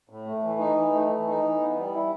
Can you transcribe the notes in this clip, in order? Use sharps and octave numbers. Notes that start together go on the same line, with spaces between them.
A2
A3
E3
D#4
E3
A3
E3
D#4
E3
B3
G3
E4